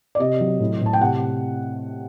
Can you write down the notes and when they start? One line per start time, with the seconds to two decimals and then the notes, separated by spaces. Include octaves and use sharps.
0.15 D5
0.19 C3 D#5
0.40 F#3
0.60 A2
0.81 A2 A5
0.93 G5
1.01 C3 F#5